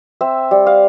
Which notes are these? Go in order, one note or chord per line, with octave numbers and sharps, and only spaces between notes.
C4 E5
G3
F5